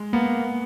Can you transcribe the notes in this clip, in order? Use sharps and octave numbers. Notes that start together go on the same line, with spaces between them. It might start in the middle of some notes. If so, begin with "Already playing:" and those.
Already playing: G#3
A#3 B3